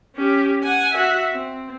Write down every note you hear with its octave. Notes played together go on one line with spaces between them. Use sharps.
C#4 G4
F#5 G#5
F#4 E5
C4